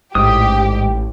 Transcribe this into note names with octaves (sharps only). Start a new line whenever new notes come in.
A1 G#2 G4 D#6